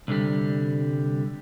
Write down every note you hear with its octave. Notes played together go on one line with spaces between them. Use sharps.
C2 D3 G3